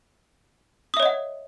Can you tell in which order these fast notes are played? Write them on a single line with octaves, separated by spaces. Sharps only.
D#6 E5 C#5 D#5 F#5